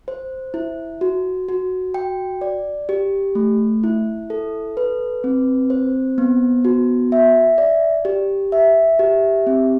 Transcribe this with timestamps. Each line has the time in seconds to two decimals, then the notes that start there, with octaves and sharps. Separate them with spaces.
0.08 C5
0.54 E4
1.01 F#4
1.49 F#4
1.94 G5
2.41 D5
2.89 G4
3.35 A3
3.83 E4
4.30 A4
4.77 B4
5.24 C4
5.70 C5
6.18 B3
6.65 F#4
7.12 E5
7.58 D5
8.05 G4
8.52 E5
8.99 G4
9.47 C4